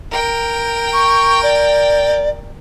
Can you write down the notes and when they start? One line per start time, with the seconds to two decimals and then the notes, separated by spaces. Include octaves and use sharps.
0.11 A#4 G5
0.93 C#6
1.43 D5